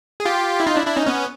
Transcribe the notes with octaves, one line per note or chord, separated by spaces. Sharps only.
G#4
F4 G4
E4
D#4 F4
D4 E4
D4 E4
C#4 D#4
B3 C#4